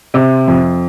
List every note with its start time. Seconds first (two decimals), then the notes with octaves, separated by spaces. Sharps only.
0.14 C3
0.48 F2